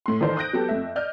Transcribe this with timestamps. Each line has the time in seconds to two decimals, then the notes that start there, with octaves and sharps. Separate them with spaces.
0.06 A2 C6
0.21 D#3 E3 D#4 A4 C5 D5
0.37 D#6 F#6 G6 A#6 D7
0.53 F#3 B3 G4 A4
0.69 F2 A3 E5
0.96 D5 D#5 F6 G6